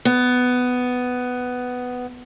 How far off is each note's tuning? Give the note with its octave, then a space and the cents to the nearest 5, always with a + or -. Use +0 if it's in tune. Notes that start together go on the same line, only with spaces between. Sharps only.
B3 +10